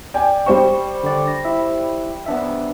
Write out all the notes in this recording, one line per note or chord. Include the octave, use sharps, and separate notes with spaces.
D5 G5 G#5
G3 C5 C#6
D3 D5
A#6
E4 E5
B3 D4 E5